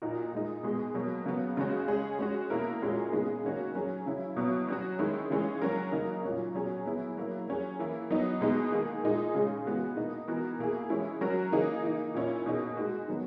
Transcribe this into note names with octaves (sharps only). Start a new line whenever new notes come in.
A#2 A#3 D#4 F#4 A#4
A#2 G#3 D#4
B2 G#3 B3
B2 F#3 A#3
C#3 F#3 B3
C#3 G#3 C#4 F#4
G#3 C#4 G#4
G#3 C#4 F#4
B2 A#3 E4 A#4
A#2 G#3 C#4 F#4 A#4
C#3 G#3 B3 D#4
D#3 A#3 C#4 F#4
F#3 C#4 G#4
C#3 F#3 C#4 E4
B2 F#3 B3 E4
F#3 C#4 F#4
D#3 G#3 C#4 E4
C#3 E3 G#3 C#4
F#3 C#4 F#4 A#4
C#3 F#3 A#3 D#4 A#4
A#2 F#3 C#4
B2 F#3 C#4 G#4
F#3 B3 E4 G#4
F#3 A#3 E4
F#3 C#4 G#4
E3 A#3 E4
F#3 B3 D#4
B2 G#3 B3 D#4
D#3 A#3 D#4 G#4
A#2 G#3 D#4 G#4
C#3 G#3 C#4 G#4
E3 G#3 B3 F#4
B2 A#3 D#4
E3 B3 F#4 A#4
B2 A#3 E4 G#4
E3 G#3 C#4 E4
F#3 C#4 F#4 A#4
C#3 E3 A#3 D#4 G#4
E3 A#3 D#4
A#2 A#3 C#4 E4
B2 A#3 D#4 G#4
G#3 D#4 F#4
D#3 F#3 B3